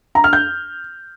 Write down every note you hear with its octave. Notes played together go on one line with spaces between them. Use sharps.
A#5
F6
G6